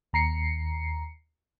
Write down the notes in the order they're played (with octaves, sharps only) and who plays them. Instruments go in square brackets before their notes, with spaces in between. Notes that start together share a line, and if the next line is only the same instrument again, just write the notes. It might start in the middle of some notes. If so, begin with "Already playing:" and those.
[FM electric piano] D#2 A#5 C7 C#7